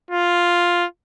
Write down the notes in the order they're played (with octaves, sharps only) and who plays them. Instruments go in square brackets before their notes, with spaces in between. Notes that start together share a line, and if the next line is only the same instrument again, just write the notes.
[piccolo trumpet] F4